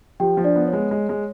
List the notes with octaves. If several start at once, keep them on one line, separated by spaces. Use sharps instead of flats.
F3 G4 G5
F3
D4 D5
B3
C#5
G#3
G#3
G#3